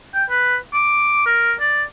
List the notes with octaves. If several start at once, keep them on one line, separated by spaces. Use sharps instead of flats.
G5
B4
D6
A#4
D5